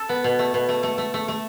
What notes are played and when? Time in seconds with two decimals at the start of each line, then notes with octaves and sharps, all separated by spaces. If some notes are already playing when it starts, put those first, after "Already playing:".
Already playing: A4
0.09 B3
0.24 B2
0.39 A3
0.54 B2
0.69 A3
0.83 A3
0.98 A3
1.14 A3
1.28 A3